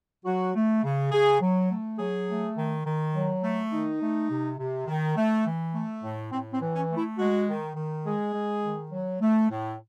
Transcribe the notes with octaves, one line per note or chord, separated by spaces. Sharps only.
F#3 F#4
A3
C#3
C#3 G#4
F#3
A3
F#3 G#4
A3
D#3
D#3
F#3
A3
D#3 D#4
A3
C3
C3
D#3
A3
E3
A3
A2
A2 C4
C4
E3
C#4
A3
E4
G#3 F#4
D#3
D#3
G#3 G#4
G#3
D#3
F#3
A3
A2